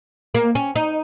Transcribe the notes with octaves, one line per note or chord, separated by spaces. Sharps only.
A#3
C#4
D#4